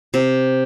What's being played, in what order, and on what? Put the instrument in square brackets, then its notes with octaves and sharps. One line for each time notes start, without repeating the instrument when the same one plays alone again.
[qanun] C3